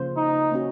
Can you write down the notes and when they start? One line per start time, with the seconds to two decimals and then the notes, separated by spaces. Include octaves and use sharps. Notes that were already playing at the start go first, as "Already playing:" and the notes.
Already playing: C#3 F3 A#3 F4 C5
0.17 D#4
0.52 A#3 C#4 F#4